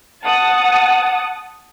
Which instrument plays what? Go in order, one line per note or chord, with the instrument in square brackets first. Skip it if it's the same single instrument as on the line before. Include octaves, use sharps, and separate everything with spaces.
[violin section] F#5 A5 D#6